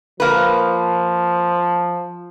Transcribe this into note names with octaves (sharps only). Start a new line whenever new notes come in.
F3 A#3 B4